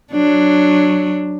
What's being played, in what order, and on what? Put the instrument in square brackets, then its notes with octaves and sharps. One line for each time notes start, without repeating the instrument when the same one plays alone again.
[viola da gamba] F#3 D4